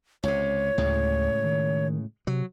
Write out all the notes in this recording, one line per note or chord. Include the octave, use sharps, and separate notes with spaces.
C#2 C3 C#5
D2 A2 C#3 G#3
D#3
C3 F#3